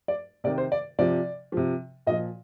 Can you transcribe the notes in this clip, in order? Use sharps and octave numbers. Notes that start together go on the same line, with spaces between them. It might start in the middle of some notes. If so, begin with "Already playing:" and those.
D5
C3 D#3 D5
C5
D5
C3 F3 D5
C3 F3
A#2 F3 D#5